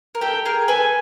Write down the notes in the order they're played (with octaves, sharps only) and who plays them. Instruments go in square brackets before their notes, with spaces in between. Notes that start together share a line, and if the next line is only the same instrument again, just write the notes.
[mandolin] A#4
[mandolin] G4 A4 [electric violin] G5
[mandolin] G#4 A#4
[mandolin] A4 B4 [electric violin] G#5